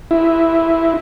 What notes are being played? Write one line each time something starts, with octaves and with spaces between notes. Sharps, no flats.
E4